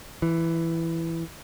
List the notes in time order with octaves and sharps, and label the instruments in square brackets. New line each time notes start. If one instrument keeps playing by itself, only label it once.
[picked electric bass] E3